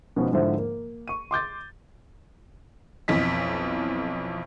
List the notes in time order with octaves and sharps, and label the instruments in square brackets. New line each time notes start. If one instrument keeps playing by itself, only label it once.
[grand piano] B2 F3 G#3 B3 C#4 D#4
G#2 D3 F3 E4 C5 E5
A#3
C#6 D#7
C6 D6 G6 A6
[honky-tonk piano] B1 F2 E3 D#5 B6